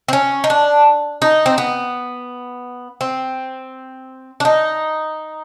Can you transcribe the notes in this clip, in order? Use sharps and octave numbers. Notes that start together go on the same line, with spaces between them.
C4
C#4
D#4
D4
D#4
C4
B3
C4
D4
D#4